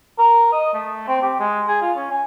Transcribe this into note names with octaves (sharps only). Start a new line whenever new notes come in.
A#4
D#5
A3
C4
G4
G#3
G#4
F4
C#4
G#5